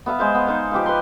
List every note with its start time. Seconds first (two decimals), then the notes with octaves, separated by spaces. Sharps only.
0.06 B3 E5 F5 B5
0.19 G#3 C5 F5
0.35 B3
0.47 D#4 C5 F5
0.71 F3 G4 B4 F5
0.86 B4 C6